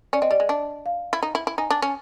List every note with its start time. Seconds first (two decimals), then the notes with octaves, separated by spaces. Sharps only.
0.13 C#4 D5
0.22 C4 D#5
0.31 G3 D5
0.40 G#3
0.49 D4
0.86 F5
1.13 E4
1.23 D#4
1.35 E4
1.47 E4
1.58 D#4 G#5
1.70 D4
1.82 C#4